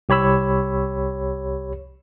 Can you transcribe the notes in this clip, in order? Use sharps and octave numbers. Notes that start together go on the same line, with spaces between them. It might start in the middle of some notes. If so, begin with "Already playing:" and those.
C2 G4 C#5 B5 E6